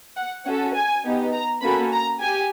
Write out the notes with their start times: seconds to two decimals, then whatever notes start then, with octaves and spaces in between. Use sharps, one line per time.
0.16 F#5
0.45 C#4 F#4 A4 F#5
0.75 G#5
1.04 B3 D#4 G4
1.33 A#5
1.62 A#3 C#4 F#4 A4 B5
1.92 A#5
2.20 G4 G#5